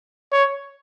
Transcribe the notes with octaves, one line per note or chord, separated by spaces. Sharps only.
C#5